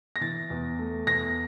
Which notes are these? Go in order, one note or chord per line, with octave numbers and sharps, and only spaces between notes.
A#6
E3 A6
E2
A3
E2 A#6